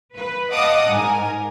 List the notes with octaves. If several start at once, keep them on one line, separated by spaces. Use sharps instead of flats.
B4
D#5 F5 F#5 A5 D6 D#6
G#2 A#4 G#5